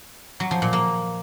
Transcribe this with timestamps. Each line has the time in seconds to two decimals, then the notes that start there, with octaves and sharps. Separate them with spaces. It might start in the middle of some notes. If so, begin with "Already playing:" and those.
0.40 F#3
0.51 F3
0.62 A#2
0.73 A#3